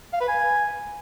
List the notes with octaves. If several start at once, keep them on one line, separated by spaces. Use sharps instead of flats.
F5
B4
G#5